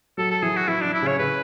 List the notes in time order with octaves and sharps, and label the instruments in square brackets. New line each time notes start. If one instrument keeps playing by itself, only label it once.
[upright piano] F#3 [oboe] A4
[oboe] A4
[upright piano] E3 [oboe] G#4
[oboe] F#4
[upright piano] E3 [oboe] E4
[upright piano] E3 [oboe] D4
[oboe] E4
[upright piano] C#3 [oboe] C#5
[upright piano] C#3 [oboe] B4